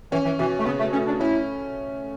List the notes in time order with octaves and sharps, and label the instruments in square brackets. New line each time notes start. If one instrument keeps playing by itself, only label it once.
[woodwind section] E3 [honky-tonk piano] C#4
[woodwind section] E3
[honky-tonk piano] B2 [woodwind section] E3
[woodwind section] A3
[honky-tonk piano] C#3 [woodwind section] B3
[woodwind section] A3
[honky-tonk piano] A3 [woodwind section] C#4
[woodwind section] D4
[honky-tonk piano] C#4 [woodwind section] E4